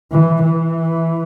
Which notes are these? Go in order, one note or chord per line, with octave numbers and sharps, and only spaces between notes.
E3
E3